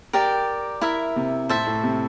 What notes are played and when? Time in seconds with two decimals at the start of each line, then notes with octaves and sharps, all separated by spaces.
0.13 G4 A#4 D5 G5
0.81 E4 A#4 E5
1.16 C3
1.49 A2 C5 E5 A5
1.66 A2
1.83 C3